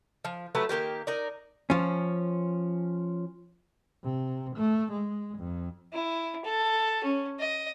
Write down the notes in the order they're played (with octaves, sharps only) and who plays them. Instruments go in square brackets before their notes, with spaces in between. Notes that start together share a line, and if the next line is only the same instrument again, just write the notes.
[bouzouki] F3
F#3 A3 G4 B4
D#3 G#3 A#3 G4
D#4 A#4 D5
[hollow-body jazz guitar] F3 C#4
[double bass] C3
A3
G#3
F2
[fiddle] E4
A4
C#4
D#5